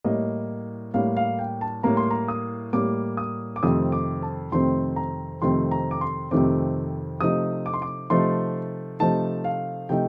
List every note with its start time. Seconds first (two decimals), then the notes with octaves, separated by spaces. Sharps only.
0.04 A2 G3 A#3 D#5
0.94 A2 G3 A#3 F5
1.17 F5
1.39 G5
1.61 A5
1.83 A2 G3 A#3 A#5
1.97 C6
2.11 A#5
2.28 D#6
2.73 A2 G3 A#3 D6
3.17 D#6
3.56 D6
3.63 F2 C3 D#3 A3 C4 D#6
3.92 D6
4.23 A5
4.52 F2 C3 D#3 A3 C4 C6
4.96 A#5
5.42 F2 C3 D#3 A3 C4 C6
5.71 A#5
5.91 D6
6.01 C6
6.31 F2 C3 D#3 A3 C4 D6
7.20 C3 F3 A3 D#4 D#6
7.66 D6
7.74 C6
7.82 D6
8.10 C3 F3 A3 D#4 C6
9.00 C3 F3 A3 D#4 A5
9.44 F5
9.89 C3 F3 A3 D#4 G5